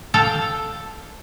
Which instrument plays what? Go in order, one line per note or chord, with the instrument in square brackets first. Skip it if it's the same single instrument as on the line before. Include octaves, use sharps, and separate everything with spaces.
[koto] A4 F5 G5